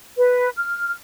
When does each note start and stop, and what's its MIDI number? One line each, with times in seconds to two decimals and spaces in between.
0.17 0.50 71
0.57 0.91 89